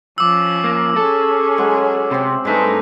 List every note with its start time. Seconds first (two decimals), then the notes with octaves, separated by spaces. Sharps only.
0.18 F3 C#4 D6 E6
0.64 A#3
0.96 C#4 G#4 A4
1.58 F#3 G#3
2.11 C3 C4 G5 C6
2.45 G2 G#3 A3 D#4 B4